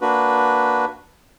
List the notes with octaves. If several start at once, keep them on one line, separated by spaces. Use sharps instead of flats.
A#3 D4 F#4 B4